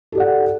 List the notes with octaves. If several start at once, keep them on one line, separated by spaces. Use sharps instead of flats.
G4 A4 D5 F#5